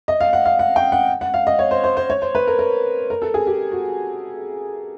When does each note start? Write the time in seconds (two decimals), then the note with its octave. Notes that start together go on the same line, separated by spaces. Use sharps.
0.08 D#5
0.21 F5
0.33 F#5
0.46 F5
0.59 F#5
0.76 G5
0.92 F#5
1.21 F#5
1.34 F5
1.47 D#5
1.59 C#5
1.71 C5
1.84 C5
1.97 C5
2.10 C#5
2.22 C5
2.35 B4
2.47 A#4
2.59 A#4
3.10 A#4
3.22 A4
3.34 G#4
3.47 G4
3.72 F#4